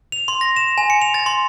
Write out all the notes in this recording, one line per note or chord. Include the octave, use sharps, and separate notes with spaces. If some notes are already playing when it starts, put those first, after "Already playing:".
F7
C6
A#6
E7
G#5
C#7
F7
A6
C6